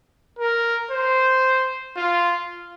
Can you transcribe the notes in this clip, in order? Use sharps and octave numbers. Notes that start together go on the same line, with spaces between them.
A#4
C5
F4